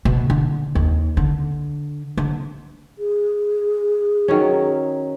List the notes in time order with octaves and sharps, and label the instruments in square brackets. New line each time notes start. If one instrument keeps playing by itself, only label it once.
[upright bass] B2
D3
D#2
D3
D3
[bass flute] G#4
[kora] D#3 F#3 C#4